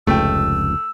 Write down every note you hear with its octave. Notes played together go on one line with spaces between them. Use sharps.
F1 C#2 A3 G5 E6